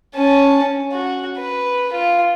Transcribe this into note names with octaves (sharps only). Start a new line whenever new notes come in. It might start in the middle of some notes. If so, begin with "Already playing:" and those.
C#4 A5
F#4
B4
F4